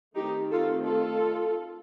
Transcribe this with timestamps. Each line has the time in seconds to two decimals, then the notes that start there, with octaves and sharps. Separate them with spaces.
0.16 D#3 A3 C4 D#4 G4
0.51 F4 A4
0.85 F4 A4